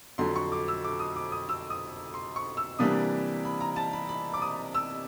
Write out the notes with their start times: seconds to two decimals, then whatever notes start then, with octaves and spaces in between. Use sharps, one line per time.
0.18 F2 D3 F#3 C6
0.36 C#6
0.52 D6
0.68 E6
0.84 D6
0.99 D#6
1.16 D6
1.32 D#6
1.49 E6
1.70 D#6
2.14 C6
2.36 C#6
2.57 E6
2.79 C3 E3 G3 A#3 D4 D#6
3.45 B5
3.61 A#5
3.76 A5
3.93 B5
4.09 B5
4.34 D6
4.42 D#6
4.75 E6